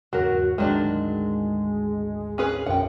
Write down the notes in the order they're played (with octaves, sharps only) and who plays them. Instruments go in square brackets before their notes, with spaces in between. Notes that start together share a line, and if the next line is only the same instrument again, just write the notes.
[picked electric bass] E2 G#2 C#3 [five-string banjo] F#3 A#4 [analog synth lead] F#4
[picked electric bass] G#1 D2 [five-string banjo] D#3 F#3 D4 [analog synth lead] G#3
[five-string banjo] C#4 G#4 B4
[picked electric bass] B1 [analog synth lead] F#2 [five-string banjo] F#5 G5